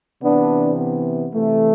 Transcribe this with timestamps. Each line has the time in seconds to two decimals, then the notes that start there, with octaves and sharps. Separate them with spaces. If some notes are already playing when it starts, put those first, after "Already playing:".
0.22 C3 E3 B3 D4
0.78 B3
1.33 C3 E3 A3